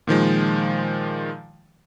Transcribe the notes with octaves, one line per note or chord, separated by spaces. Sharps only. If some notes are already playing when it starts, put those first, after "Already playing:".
A#2 D#3 F3 G#3